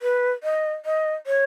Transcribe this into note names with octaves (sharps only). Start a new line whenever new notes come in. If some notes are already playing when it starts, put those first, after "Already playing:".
B4
D#5
D#5
C#5